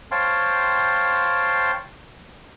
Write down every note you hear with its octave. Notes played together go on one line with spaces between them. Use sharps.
C5 C#5 F5 G5 A5 C6